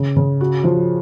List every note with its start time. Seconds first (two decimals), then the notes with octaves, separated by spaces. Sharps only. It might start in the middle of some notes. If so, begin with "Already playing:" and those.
Already playing: C#3
0.16 C#3
0.41 F#4
0.64 F3